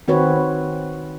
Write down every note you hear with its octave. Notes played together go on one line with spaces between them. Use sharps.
D#3 C4 F#4 B4 C#5